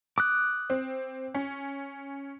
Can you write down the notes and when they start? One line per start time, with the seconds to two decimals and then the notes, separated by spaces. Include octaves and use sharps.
0.18 D6 D#6 F#6
0.70 C4
1.34 C#4